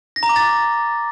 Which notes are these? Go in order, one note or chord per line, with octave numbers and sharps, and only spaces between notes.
A#6
A#5
D6
A6